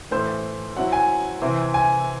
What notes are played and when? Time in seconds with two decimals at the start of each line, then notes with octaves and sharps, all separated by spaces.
0.11 A2 E3 A3 C5
0.76 F#3 C4 E4 F#5
0.92 G#5
1.42 C3 E3 C4 E4
1.74 G#5